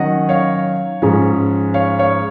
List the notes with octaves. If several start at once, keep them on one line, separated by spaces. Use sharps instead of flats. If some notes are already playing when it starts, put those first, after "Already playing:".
Already playing: D#3 F#3 C#4 D#5 F#5
C#5 F5
G#2 F3 G#3 C#4
C#5 F5
C#5 F5